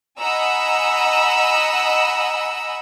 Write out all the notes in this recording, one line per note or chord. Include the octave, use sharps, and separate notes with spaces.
D#5 F#5 G#5 A#5 B5 E6